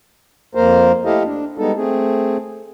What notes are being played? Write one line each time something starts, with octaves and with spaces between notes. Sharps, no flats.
F2 A#3 A#4 C5
A3 E4 G4 A4 D#5 F5
D4
G3 G#3 B3 D#4 A4
A3 C4 G#4